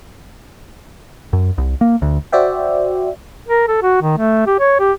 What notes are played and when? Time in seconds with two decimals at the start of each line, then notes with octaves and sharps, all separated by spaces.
1.33 F#2
1.58 C2
1.81 A#3
2.02 D2
2.32 F#4 C5 D5 E5 G5
3.48 A#4
3.68 A4
3.82 F#4
4.01 D#3
4.17 A3
4.46 G4
4.59 C#5
4.79 G4